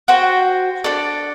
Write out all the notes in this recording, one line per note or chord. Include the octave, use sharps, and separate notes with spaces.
F#4 C5 G5
D4 A4 D5